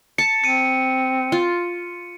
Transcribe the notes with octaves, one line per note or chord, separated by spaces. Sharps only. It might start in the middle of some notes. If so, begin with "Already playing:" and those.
A5 C#7
C4 C#7 D#7
F4